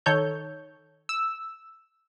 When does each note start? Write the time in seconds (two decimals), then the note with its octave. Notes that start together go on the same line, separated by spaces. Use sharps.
0.06 D#3 A4 C#5 G6
1.09 E6